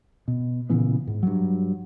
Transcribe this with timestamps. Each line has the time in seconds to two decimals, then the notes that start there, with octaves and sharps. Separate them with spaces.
0.28 B2
0.70 A#2 C#3 E3 B3
1.07 G#2
1.23 G2 F#3